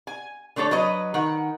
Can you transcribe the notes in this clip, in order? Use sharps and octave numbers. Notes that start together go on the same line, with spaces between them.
G#5
D3 A3 D4 A4 C#5
F#3 B4 D#5
D#3 F#5